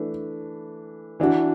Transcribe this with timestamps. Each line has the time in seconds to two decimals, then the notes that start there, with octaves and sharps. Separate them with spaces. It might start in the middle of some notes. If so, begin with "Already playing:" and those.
Already playing: E3 A3 D4 B4
1.20 E3 D4 F#4